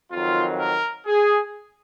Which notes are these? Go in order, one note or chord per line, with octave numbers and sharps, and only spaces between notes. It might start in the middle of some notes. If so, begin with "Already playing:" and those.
F2 D#3 F#3 F4
A#4
G#4